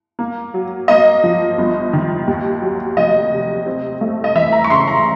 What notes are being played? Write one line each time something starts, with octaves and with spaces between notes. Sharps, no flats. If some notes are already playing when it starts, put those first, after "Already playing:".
A#3
F#3
A#3 D#5
F3
G1
D#3
D#2
F#3
F1 D#5
C3
C4
A3
D#5
E3 E5
A#5
C#6
C#3 C6
A#5